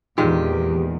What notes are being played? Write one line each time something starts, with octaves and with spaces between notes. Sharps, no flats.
E2 A#2 D#3 G#3 G4